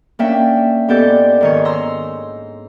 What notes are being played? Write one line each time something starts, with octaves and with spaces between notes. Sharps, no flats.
A#3 C#4 D4 E5 G5
G#2 B3 G4 A4 D5 G6
G#2 D#3 C#5
A#5 C6 E6